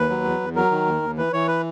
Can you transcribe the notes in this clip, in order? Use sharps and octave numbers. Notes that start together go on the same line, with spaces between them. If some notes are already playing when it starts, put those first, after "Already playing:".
Already playing: D#2 B4
F#3
E2
E2
F#3 A#4
D#3
D#2
D#2
E3 B4
E3 C#5
B4